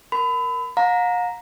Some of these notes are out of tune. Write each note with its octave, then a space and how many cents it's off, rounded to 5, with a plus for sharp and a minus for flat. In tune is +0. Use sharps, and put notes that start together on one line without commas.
A#4 +0 B5 +30
F5 +45 A#5 +0